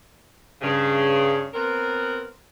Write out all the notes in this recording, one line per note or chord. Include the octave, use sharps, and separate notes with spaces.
G2 C#3
B3 C4 A#4